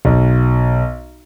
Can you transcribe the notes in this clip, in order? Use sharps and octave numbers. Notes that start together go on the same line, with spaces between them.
B1